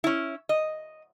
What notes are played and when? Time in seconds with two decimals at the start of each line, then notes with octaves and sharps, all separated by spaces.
0.04 C#4 E4
0.49 D#5